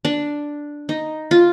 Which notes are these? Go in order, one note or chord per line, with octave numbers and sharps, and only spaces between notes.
D4
D#4
F4